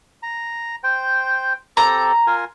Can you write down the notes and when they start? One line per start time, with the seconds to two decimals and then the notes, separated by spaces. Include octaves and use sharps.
0.23 A#5
0.84 C5 G5
1.77 C4 G4 A4 A#5
2.27 F4 A#4 G#5